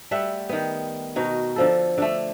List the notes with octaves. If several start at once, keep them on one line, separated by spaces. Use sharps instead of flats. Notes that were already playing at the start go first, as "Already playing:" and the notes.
G3 A3 E5 F#5
D#3 B3
B2 D#4 F#4
D3 F3 A4
D3 A3